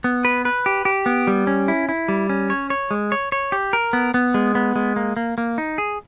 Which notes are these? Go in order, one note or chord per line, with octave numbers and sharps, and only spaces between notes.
B3
B4
B4
G4
G4
B3
G3
C#4
E4
E4
G3
C#4
C#5
C#5
G#3
C#5
C#5
G4
A#4
B3
B3
G#3
B3
G#3
A#3
A#3
A#3
D#4
G#4